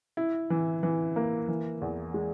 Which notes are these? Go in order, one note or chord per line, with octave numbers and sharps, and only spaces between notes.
E4
E3
E3
A#3
E3
E2
G#3